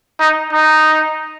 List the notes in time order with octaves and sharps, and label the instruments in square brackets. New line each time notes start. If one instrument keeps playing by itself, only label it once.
[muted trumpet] D#4
D#4